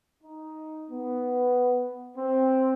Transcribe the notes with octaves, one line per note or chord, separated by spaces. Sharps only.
D#4
B3
C4